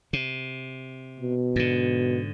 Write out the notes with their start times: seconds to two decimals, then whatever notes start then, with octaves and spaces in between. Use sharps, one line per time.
0.13 C3
1.20 B2
1.56 G#2 D3